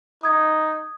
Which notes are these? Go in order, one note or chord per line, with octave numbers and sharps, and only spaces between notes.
D#4 D#6 G#6